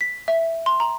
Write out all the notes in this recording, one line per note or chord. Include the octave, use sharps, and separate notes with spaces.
B6
E5
C6
A#5